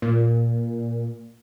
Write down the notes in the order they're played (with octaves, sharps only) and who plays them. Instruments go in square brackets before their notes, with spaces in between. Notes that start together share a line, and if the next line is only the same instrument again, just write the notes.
[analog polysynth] A#2